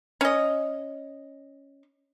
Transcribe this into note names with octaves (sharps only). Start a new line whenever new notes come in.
C#4 D#5